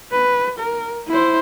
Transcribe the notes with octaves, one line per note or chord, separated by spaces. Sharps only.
B4
A#4
E4 C5